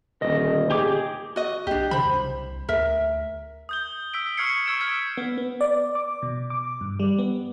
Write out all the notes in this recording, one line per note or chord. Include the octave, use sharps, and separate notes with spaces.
D#1 D2 D#5
G4 G#4 D6
F#4 D#5
B1 D4 G4
C3 C5 B5
C2
D2 A#4 E5
D#6 G6 G7
E6 B6 D7
C#6 D#6 F6 G#6 C7 C#7
C#6 E6 G#6 D7 E7
E6 F6 G#6 B6 C#7 D7
B3
B3
D5
D6
B2
D6
G2
G3
B3